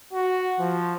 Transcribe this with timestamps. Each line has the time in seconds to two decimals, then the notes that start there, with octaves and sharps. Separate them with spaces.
0.13 F#4
0.60 F3